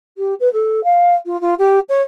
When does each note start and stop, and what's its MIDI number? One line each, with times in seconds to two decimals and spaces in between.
0.18 0.34 67
0.40 0.51 71
0.53 0.83 69
0.84 1.15 77
1.25 1.39 65
1.41 1.54 65
1.58 1.79 67
1.89 2.01 73